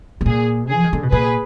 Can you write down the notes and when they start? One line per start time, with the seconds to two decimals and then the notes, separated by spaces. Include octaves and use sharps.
0.21 B2
0.26 A#2 G#4
0.69 G#4
0.75 F3
0.84 D#3
0.93 D3
1.03 B2
1.12 A#2 G#4 B4